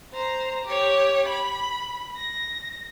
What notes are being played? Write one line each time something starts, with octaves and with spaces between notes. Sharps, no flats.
C5 A#5
G4 C#5
B5
A#6